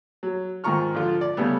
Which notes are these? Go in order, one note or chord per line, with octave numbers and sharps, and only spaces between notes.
F#3
G#2 D#3 F4 A#5 C#6 F6
D3 F3 F4
D5
C#3 G3 A3 B3